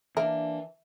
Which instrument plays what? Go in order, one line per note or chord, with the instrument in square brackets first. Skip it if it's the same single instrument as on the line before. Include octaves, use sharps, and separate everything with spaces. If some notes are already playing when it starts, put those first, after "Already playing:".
[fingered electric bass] E3 [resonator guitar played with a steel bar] A#3 D4 [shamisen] A#4 [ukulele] E5